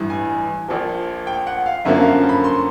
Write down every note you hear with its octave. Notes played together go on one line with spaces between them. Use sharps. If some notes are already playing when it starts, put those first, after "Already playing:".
Already playing: A1 G2 E3
G#5
A#1 A#2 F3
G5
F#5
F5
F#2 D3 F3 A#3 C#4 E5
F5
B5
C6